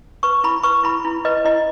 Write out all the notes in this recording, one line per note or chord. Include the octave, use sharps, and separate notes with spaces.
B4 C#6
E4 B5
B4 C#6
E4 B5
E4
B4 D#5
E4 D#5